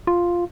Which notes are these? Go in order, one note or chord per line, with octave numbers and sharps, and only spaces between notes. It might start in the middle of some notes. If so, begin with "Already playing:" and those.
F4